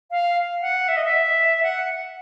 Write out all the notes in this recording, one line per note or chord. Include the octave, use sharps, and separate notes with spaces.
F5
F#5
E5
D#5
E5
F#5